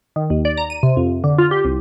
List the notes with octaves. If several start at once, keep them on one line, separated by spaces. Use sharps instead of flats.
D#3
D#2
D5
A#5
D#7
C3
F2
D3
F4
G4
C2